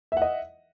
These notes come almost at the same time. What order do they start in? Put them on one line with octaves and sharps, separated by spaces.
E5 F#5 D#5